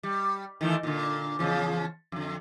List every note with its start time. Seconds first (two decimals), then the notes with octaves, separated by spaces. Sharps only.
0.03 G3
0.61 D#3 E3 A3
0.83 A#2 D3
1.39 E2 C#3 F3
2.12 F2 D3